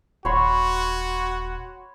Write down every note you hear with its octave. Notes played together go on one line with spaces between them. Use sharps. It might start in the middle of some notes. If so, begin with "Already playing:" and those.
D#1 F#4 C#5 B5 C6